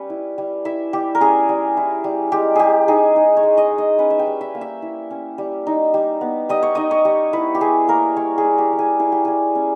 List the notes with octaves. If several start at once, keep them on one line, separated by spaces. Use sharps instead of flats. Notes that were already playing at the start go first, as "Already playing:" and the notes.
Already playing: G3 C#4 B4 G5
E4
G3
E4 E5
G3 G4
A#4
C#4 G#4
G3
E4
G3
G#3 G4
G#3 G4 G#4
D#4 G#4
D#4
C#5
G#3
D#5
G#3
D#5
C#4 B4
E5
G5
G3
E5
A#3
E5
E4
C#4
G3
D#4
G3
B3
G3 D#5
C#5
D#4 D#5
C#5
G3
E4 B4
G4
G3 G#4
A#3 A#4
G3 C#5
G#4
E4
G4
G3
G#4
E4 G#4
G4
G3 G#4
C#4